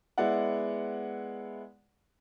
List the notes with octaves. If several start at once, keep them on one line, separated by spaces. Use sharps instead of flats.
G#3 B3 E4 D5 F#5